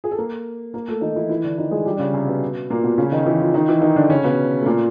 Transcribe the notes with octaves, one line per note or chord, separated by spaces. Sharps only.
G#4
A4
A#3 A#4
A#3 A#4
A3 A4
D#3 D#4
E3 E4
E3 E4
D3 D4
D#3 D#4
G#3 G#4
G3 G4
D4
C#3 C#4
C3 C4
B2 B3
A#2 A#3
B2 B3
C#3 C#4
D#3 D#4
E3 E4
F3 F4
D#3 D#4
E3 E4
D#3 D#4
D3 D4
C#3 C#4
B2 B3
A3
A#2 A#3